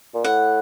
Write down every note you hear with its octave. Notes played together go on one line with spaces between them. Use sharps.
A#2
A2 F#5